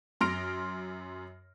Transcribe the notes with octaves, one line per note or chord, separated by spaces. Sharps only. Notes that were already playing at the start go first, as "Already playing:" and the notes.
F#2 C6 F6 A#6 D7